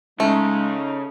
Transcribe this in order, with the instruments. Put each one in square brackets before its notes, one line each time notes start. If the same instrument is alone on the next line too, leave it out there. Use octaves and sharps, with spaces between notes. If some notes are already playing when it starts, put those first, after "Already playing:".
[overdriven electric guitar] C#3 [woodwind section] G#3 [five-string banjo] A3 [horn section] D#4